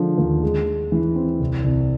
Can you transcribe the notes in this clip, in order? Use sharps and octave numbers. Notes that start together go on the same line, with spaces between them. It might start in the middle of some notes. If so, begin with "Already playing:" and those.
Already playing: D3 F3 G#3
D#2
G#3
G#3
E3
C4
C2
C2